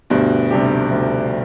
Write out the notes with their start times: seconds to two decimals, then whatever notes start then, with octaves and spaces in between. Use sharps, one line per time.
0.10 D2 G2 B2
0.51 C3 G3 D4 G4
0.91 D2